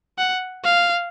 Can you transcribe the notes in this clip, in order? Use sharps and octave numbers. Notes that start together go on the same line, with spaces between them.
F#5
F5